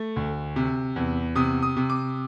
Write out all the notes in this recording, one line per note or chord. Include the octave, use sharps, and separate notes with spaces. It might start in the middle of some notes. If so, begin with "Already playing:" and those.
Already playing: A3
D2
C3
E2
C3 D#6
D#6
C3
D6